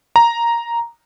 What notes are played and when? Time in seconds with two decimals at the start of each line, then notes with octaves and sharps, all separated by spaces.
0.16 A#5